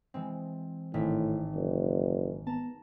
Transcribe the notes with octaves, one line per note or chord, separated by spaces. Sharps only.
E3 G#3 C4
G#1 A2 G#3 B6
F#1
B3 A5 A#5